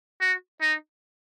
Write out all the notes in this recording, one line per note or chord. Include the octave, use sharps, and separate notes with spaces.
F#4
D#4